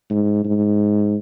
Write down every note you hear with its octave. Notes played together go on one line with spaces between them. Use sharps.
G#2
G#2